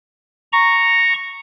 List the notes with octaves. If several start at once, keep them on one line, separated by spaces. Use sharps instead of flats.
A#5 C#6